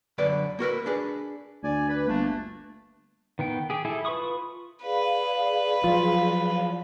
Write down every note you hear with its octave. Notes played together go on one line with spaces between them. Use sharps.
F#2 D3 B4 D5 B5
A#3 F#4 A#4 B4
D4 G#4 B4
D2 D5 G#5
B4
G1 A3 A#3 D4
D#3 B3 G5
G4 G#4
E4 G#4 A4
F4 B4 B5 C#6 D#6
G#4 B4 D5 F5
F3 F#3 F4